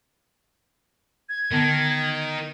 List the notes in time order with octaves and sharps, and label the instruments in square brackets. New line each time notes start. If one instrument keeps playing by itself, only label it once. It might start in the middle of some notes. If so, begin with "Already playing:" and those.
[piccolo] G#6
[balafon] D3 B3 A5 [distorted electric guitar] D#3